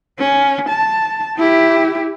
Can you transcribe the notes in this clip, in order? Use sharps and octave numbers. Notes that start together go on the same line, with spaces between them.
C#4
A5
E4 G4